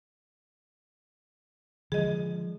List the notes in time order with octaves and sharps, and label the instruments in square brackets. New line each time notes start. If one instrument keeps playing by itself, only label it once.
[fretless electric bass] D3 F3 G#3 [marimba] G#4 D#5